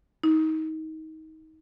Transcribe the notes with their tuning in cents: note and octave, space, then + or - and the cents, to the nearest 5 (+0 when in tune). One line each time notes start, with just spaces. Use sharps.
D#4 +25